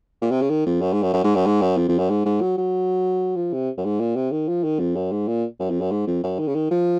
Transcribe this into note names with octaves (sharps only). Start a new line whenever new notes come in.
A#2
C3
C#3
D#3
F2
F#2
G#2
F#2
F#2
G#2
F#2
G#2
F#2
F2
F2
F#2
G#2
G#2
F#3
F#3
F3
C3
F#2
G#2
A#2
C3
D#3
F3
D#3
F2
F#2
G#2
A#2
F#2
F2
F#2
G#2
F2
F#2
D#3
C#3
D#3
F3